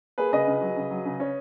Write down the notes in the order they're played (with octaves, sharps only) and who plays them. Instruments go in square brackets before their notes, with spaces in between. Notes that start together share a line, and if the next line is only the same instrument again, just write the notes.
[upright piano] A#3 [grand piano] G#4 B4
[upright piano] C#3 [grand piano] B4 D#5
[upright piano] C#2
F#3
C#3
F#3
C#3
C#4